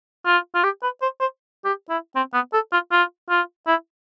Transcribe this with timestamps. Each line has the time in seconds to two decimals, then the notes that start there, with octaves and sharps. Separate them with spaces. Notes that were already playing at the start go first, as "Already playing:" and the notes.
0.26 F4
0.55 F4
0.64 G4
0.83 B4
1.02 C5
1.20 C5
1.65 G4
1.90 E4
2.16 C4
2.34 B3
2.53 A4
2.72 F4
2.91 F4
3.30 F4
3.67 E4